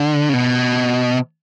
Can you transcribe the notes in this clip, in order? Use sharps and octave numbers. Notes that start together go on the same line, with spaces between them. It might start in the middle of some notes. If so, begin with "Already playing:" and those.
Already playing: D3
C#3
B2